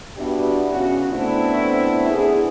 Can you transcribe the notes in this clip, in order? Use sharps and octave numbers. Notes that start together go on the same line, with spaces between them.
G3 B3 D4 E4 F#4 G4
C#3 F#4
A3 B3 C4 D4 E4
B3 D4 E4 G#4